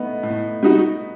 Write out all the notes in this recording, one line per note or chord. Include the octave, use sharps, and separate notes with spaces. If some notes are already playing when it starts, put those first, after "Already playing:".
Already playing: A3 B3 D#4
A2
G3 D#4 F#4